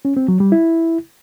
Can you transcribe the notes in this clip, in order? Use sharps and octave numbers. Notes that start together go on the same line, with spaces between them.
C#4
C4
F#3
G3
E4